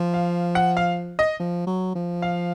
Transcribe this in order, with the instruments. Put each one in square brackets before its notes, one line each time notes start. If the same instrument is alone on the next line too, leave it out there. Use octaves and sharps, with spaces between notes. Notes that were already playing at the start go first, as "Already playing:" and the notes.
Already playing: [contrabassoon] F3
[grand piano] F5
F#5
F5
D#5
[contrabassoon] F3
F#3
F3
[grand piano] F5